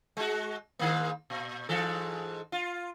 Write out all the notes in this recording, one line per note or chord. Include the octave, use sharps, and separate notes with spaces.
G#3 F#4
G#2 D#3 A#3
A#2
G#2 E3 A4
F4